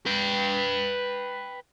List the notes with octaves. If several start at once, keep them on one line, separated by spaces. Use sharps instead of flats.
B4 G5